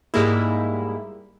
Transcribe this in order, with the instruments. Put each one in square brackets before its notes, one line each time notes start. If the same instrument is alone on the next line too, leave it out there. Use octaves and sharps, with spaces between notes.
[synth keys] G#2 G3 G#3 A#3 E4